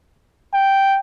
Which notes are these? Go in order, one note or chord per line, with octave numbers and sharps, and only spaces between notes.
G5